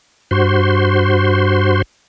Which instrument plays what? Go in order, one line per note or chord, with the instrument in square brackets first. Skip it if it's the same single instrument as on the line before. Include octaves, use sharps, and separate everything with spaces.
[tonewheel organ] G2 F#4 C5 C6